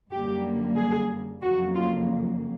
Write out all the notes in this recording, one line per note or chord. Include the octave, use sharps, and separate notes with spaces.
F#2 D3 G3 A#3 G4
G#4
F2 C#3 F#3 A#3 F#4
F4